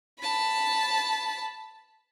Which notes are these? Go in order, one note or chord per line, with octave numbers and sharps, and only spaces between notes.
A5 B5